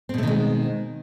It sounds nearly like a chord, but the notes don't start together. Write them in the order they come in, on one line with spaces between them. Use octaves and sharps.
C4 B2 A3 D#3 G#3